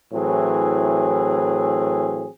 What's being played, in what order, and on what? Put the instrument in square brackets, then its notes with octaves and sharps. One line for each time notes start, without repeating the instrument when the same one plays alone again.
[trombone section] A2 E3 F#3 C4 G#4